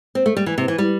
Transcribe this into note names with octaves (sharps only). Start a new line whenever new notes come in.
C4
A3
G3
E3
C3
E3
G3